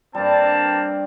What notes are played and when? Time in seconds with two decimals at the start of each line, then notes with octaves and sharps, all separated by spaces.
0.15 G2 G3 A#3 C4 A5